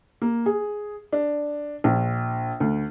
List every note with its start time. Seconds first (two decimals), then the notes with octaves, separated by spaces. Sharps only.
0.22 A#3
0.46 G#4
1.12 D4
1.84 A#1
2.60 D2